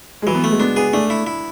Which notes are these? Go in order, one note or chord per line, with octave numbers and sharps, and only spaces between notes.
G#3
E3 F#3
B3
A3
G#3
B3 D4
B3 G#4
A3 D4
E4
E4